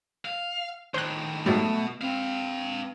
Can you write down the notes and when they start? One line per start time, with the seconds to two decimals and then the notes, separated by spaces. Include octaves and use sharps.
0.25 F5
0.94 A2 D#3 C5 F#6
1.46 G#2 B2 F#3 G3 A3
2.01 C4 B4 F5